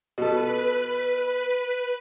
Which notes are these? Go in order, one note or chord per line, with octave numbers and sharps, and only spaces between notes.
B2 A4 B4